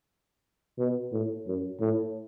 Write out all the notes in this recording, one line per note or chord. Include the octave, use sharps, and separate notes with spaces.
B2
A2
F#2
A2